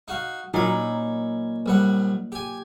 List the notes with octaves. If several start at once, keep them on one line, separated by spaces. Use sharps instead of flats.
D#4 F#4 F5
A#2 F#3 C#4 D#4 B5
A#1 G3 F#5
G4 G#5